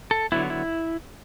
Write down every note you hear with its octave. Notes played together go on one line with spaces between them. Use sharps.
A4
D3 F#3 B3 E4
E4